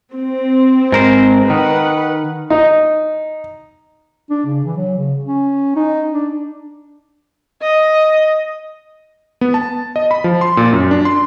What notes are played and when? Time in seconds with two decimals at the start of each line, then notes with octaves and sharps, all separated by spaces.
0.17 C4
0.92 G#2 A#4 C5
1.50 D#3 B4 F#5
2.50 D#4
4.30 D4
4.46 C#3
4.65 E3
4.77 F#3
4.98 C#3
5.25 C#4
5.76 D#4
6.12 D4
7.62 D#5
9.41 B3
9.54 A5
9.96 D#5
10.11 B5
10.24 F3
10.41 C6
10.57 A#2
10.73 F#2
10.91 D4
11.05 C6